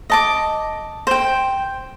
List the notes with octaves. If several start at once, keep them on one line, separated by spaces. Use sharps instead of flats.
D#5 A5 D6
C5 G5